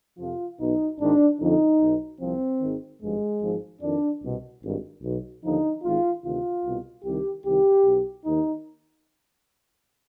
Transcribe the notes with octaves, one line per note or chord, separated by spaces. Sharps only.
F2 C3 F3 F4
B1 B2 D#4
G#1 G#2 D#3 D4
F2 D3 F3 D#4
B1 B2
C2 C3 F3 C4
G#1 G#2 D#3
G#1 G2 F3 G#3
G#1 G#2 F3
F2 D#3 D4
C2 B2
G#1 G2 D#3
B1 B2
D#2 D3 F3 D#4
G#1 G#2 D#3 F4
D2 C3 D#3 F4
C2 B2
C2 C3 D#3 G4
C2 C3 D#3 G4
B1 B2
D#2 D#3 D#4